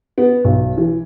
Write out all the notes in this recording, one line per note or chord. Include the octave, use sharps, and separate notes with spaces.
B3
B1
E3